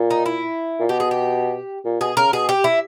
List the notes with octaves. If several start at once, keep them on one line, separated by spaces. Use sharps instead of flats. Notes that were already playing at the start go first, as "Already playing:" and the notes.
Already playing: A#2
D#4
E4
A#2
B2 G4
G#4
G4
A#2
B2 G#4
C#3 A#4
B2 G#4
G4
E4